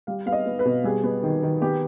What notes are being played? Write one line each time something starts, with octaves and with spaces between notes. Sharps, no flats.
G3 F5
B3 F5
D#5
B3
B4
B2
G3 G#4
B3
D#3
D#3
B3 G4